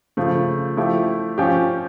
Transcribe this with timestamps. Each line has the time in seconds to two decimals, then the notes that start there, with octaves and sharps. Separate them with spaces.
0.17 C#3 F3 A3
0.77 F3 A3 E4 G4
1.38 F3 C#4 G4